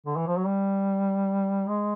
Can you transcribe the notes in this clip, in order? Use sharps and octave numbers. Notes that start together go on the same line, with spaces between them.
D3
E3
F3
F#3
G3
G#3